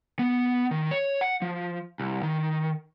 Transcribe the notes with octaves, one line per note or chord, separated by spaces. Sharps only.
B3
D#3
C#5
F#5
F3
C2
D#3